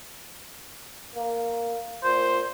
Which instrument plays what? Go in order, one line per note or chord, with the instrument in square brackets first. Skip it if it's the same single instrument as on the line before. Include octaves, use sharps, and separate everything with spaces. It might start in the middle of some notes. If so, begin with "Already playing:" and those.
[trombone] A#3
[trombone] A#2 [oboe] C5